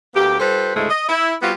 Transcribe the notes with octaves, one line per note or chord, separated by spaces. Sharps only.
D2 A#3 B3 G4
G3 F4 A4 B4 C5
D2 G#2 C#3 G#3 A3 E4
D#5
E4
G3 B3 C4 F4 F#4